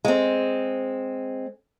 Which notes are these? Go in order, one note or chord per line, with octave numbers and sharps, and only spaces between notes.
G#3 C4